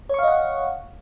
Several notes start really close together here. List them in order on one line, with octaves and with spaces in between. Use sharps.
C#5 C#6 F5 D#5 F#5